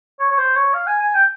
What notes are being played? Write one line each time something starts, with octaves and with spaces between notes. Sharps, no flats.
C#5
C#5
C5
C#5
F5
G#5
G#5
G5